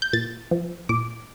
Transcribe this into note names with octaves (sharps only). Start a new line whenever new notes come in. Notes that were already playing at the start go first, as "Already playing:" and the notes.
G6
A#2 A6
F3
A#2 D6